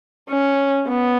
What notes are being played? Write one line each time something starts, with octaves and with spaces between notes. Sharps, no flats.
C#4
B3